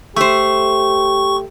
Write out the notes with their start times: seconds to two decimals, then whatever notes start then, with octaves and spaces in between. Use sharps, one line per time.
0.16 A3 G4 C5 C#6